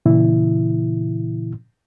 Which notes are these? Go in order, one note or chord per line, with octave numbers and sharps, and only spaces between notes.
A#2 C#3 E3 E4